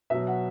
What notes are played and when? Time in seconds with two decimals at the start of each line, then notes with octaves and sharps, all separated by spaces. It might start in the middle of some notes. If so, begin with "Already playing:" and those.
0.10 B2 F#3 E5
0.27 F#5